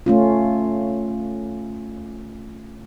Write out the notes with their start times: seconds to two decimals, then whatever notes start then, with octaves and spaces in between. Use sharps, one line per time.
0.06 A3 C#4 F4